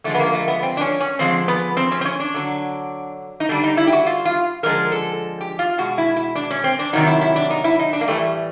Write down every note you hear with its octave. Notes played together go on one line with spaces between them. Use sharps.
D3 F3 G#3 A3
B3
A#3
A3
B3
C4
D4
C#4
C#4
D3 F3 G#3 C4
B3
C4
C#4
C4
C#4
D4
D3 F#3
D#4
D3 G3 D4
D#4
E4
G4
F#4
F4
F4
D3 F3 G#3 A#4
A4
G4
F4
B2 G#3 F#4
E4
E4
D4
C#4
C4
D4
C3 D#3 F#3 D#4
E4
E4
D4
D#4
E4
D#4
D4
A#3
A2 E3 G3 A3